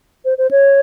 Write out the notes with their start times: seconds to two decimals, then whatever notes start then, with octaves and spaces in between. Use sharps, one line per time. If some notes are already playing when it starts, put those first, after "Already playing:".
0.25 C5
0.38 C5
0.51 C#5